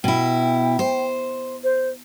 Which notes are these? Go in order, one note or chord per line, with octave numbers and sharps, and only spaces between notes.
B2 E4 G5
C5
C5